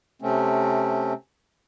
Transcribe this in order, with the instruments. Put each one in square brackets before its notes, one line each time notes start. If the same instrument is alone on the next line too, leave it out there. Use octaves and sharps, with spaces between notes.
[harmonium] C3 A3 C4 C#4